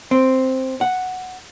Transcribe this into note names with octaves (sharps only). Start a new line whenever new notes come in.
C4
F#5